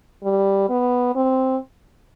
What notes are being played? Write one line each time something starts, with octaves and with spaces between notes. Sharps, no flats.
G3
B3
C4